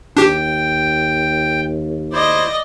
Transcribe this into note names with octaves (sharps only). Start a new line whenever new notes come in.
D#2 D4 G4 G5
E4 C5 D5 D#5